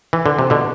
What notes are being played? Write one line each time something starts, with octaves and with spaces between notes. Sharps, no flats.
E3
D3
C3
B2 D3